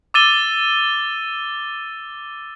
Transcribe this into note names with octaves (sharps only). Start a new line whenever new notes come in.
D6 E6 A6 D#7 G7